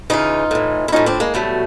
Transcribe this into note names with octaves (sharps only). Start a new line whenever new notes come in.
C#3 E3 D#4 F4
A2 E3
E4
A2 F3 C#4 D#4
C4 D4
G#3 A#3
B2 F#3 G3 A3